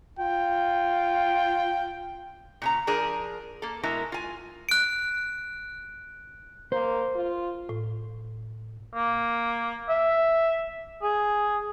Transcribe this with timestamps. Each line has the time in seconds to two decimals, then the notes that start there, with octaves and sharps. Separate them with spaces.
0.19 F4 G5
2.62 A#2 C#3 A#5
2.87 F3 D4 G#4 A#4
3.62 A#3 A4
3.83 B2 G#3 E4 A#4
4.12 F4 G#5
4.69 F#6 D7
6.72 A#3 C5
7.15 F4
7.69 A2
8.94 A#3
9.89 E5
11.02 G#4